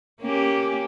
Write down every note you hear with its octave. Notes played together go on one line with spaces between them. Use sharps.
A#3 C#4 G4